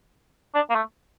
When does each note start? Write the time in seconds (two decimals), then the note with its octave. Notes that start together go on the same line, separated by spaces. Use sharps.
0.55 D4
0.70 A#3
0.75 A3